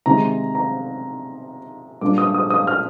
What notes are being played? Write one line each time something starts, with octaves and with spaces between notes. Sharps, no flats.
C3 D#3 G#3 A#5
A#5
A#2 G3 A#3 D4 D6
D#6
D#6
D#6
F6